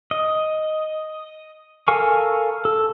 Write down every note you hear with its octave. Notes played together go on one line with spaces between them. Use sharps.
D#5
A4 A#4 F5 G#5 C#6
A4